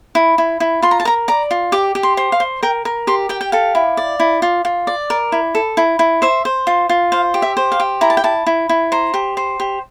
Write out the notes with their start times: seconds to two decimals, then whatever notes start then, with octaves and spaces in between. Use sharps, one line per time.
0.15 E4
0.38 E4
0.60 E4
0.82 F4 C6
0.91 A#5
1.00 A5
1.05 A#4 A#5
1.28 D5 A#5
1.51 F4
1.72 G4 D6
1.95 G4
2.03 C6
2.17 C5
2.32 F5
2.40 C5
2.63 A#4 G5
2.85 A#4
3.07 G4 C6
3.29 G4 G5
3.41 G5
3.52 A4 F5
3.75 E4
3.97 D5
4.20 E4
4.42 F4
4.65 F4
4.87 D5
5.10 A#4
5.32 E4
5.55 A4
5.77 E4
5.99 E4
6.22 C5 E5
6.45 C5
6.67 F4
6.89 F4
7.12 C5 F5
7.34 G4
7.42 E5
7.57 C5
7.72 F5
7.80 G4
8.01 E4 A#5
8.10 A5
8.17 G5
8.24 E4 A5
8.47 E4
8.69 E4
8.92 C5 A#5
9.14 G4
9.37 C5
9.60 G4